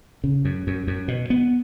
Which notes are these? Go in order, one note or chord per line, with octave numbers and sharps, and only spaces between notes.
C#3
F#2
F#2
F#2
B2
B3